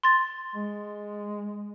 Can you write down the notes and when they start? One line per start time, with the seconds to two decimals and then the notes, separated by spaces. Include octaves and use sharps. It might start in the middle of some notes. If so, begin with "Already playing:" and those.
0.03 C6 A6
0.55 G#3